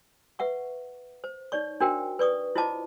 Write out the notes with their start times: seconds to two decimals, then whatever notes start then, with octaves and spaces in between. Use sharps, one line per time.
0.39 B4 E5 F#5 C#6
1.24 C5
1.52 D#4 C#5 D5 C#6
1.80 D4 F#4 A#4 C5 G5
2.19 B4 D5 C#6 D#6
2.56 E4 F4 C5 D#5 A5 D6